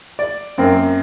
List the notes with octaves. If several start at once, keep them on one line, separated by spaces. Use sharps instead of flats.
D5
F#2 A#3 C4